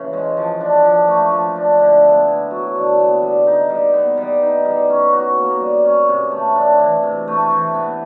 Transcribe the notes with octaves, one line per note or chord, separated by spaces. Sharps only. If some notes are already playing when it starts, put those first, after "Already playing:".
Already playing: C#3 E3 C#4
G#3
F3
D4
F3
A3
F3
D4
D3
B3
E4
F#3
D3
B3
G3
D#4
G3
B3
G3
D#4
G3
C#4
F#4
A#3
G3
C#4
C3
A3
D4
E3
C3
A3
E3
B3